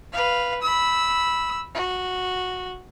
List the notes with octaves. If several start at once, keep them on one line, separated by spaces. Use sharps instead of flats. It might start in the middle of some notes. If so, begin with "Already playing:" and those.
B4 F5
B5 E6
F#4